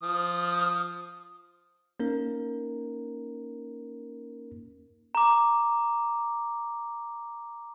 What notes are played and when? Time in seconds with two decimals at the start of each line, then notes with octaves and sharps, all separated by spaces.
0.03 F3 D#6
2.00 A#3 C#4 D#4 A#4
5.15 A#5 D6